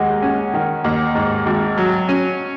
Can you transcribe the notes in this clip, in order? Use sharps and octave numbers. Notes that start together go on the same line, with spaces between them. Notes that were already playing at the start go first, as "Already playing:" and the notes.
Already playing: D#2 G#3 F#5
C#4
D#3
D#2
G#2
G#1
F#3
C#4